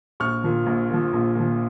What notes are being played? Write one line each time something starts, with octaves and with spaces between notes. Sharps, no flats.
A#1 C#6 F6
A#2 F3
A#1
A#2 F3
A#1
A#2 F3